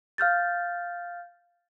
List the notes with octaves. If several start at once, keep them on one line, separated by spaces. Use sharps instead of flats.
F5 F6 G6 A6